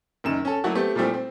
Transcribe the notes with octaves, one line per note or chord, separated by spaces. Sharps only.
F#1 F#2 D#3 E7
C#4 A4
F#3 A3 A#3 E4 F#4
A3 B3 C4 G4
A#2 F3 G3 A3 C4 E4
C4